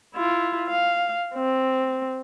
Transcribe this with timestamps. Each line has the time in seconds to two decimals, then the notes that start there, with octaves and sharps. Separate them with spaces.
0.15 E4 F4
0.68 F5
1.35 C4